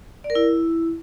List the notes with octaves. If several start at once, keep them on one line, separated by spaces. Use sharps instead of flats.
D5
A#4
E4